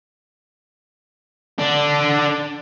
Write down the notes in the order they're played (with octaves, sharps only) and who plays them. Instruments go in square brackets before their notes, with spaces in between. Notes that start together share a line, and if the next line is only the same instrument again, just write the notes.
[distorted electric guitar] D3 D4